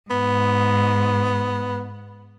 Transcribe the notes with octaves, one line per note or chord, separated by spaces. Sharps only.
G#2 B3